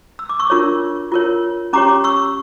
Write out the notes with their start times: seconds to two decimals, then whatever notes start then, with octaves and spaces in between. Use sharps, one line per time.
0.19 E6
0.29 D6
0.40 C#6 E6
0.50 D4 F4 A#4 C#5
1.12 F4 A#4 C#5
1.73 C#4 G4 C#5 A#5 D6
2.04 C#6 E6